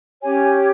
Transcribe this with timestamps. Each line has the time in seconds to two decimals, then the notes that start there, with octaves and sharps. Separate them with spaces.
0.23 C#4 G4 C#5 G#5